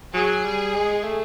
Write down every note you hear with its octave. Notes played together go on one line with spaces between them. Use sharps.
F#3 G#4
G3
G#3
A3